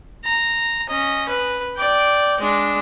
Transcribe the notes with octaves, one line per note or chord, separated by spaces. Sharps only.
A#5
C#4 D#5
B4
D5 G5
G#3 D4